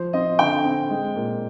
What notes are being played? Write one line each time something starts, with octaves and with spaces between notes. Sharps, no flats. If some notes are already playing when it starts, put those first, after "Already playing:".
Already playing: F3 C5
C4 D#5
D3 G5
C4
G#3
A#2